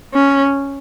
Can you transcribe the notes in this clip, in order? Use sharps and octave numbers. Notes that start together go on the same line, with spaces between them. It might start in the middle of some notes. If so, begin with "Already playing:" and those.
C#4